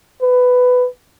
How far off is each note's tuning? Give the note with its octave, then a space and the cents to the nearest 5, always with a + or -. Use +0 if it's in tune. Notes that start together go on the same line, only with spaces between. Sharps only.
B4 +15